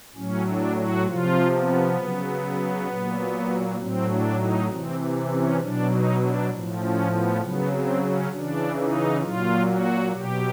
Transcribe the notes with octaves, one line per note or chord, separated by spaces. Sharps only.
A2 F#3 C#4
D4
F#4
C3 F3 F4
B3
C#3 F#3
A#2 F#3
A2 F#3 C4
D4
D#4
C3 E3 C4
C#4
B2 F#3 D4
D#4
D4
A2 F3
C#4
B3
C#3 F#3 B3
C4
C#4
C#3 E3 D4
D#4
A#2 F#3 F4
F#4
B2 F#3 G4